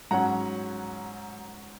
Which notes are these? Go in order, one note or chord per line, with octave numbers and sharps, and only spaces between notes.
G#2 F#3 C#4 F#5 A#5